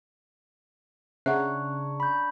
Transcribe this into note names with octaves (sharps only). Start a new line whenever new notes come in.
C#3 D4 C#5 E5 F#5 A#5 F#6
B5 G6